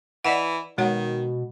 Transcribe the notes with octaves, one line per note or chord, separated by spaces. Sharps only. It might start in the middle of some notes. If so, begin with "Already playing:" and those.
E3 D5 D#5 F#5
B2 D#3 G#3 C#5 F#5